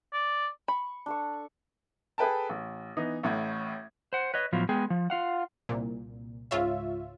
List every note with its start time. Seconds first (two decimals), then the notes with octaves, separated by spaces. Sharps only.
0.13 D5
0.68 B5 C#6
1.06 D4 A4 C#6
2.18 G#4 A4 B4 G5 A5
2.49 A1
2.97 E3 B3 D#4
3.23 A1 A2 G#6
4.13 C5 F#5
4.34 B4 C#5 D#5
4.52 A2 F3 F#3 B3 F4
4.69 G#3 B3 G#4 G5
4.90 F3
5.10 F4 F5 F#5
5.69 C2 A#2
6.51 C#2 G#2 F4 C#5 E5